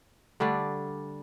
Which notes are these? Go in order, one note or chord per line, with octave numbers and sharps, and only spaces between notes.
D3 G3 A3 D4